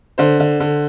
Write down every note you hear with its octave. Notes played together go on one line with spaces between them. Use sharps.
D3 C5
D3
D3